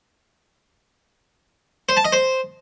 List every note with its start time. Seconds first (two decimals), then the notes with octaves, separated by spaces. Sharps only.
1.89 C5
1.97 A5
2.05 D#5
2.12 C5